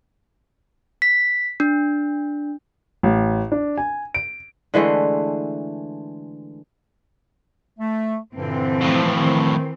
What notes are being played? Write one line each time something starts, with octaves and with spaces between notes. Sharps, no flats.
B6
D4
A1
D4
G#5
D7
D3 E3 G#3 A3
A3
G2 A#2 D3 E3 C4
F2 A2
D#3